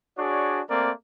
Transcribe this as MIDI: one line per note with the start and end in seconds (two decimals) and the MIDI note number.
0.18 0.61 62
0.18 0.61 66
0.18 0.61 68
0.18 0.61 73
0.18 0.61 74
0.70 0.91 57
0.70 0.91 58
0.70 0.91 60
0.70 0.91 70
0.70 0.91 74